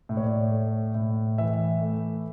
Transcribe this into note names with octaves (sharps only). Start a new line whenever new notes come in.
A2
C#5
D5
A3
A2
E3 E5
A3